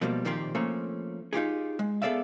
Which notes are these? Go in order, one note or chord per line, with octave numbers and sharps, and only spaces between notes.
B2 F3 G3 A#3
A#2 D#3 F3 A#3 C4 G4
F3 A3 A#3 C4 C#4
D#4 F4 G4 G#4
G#3
B3 G#4 A4 D5 E5 F5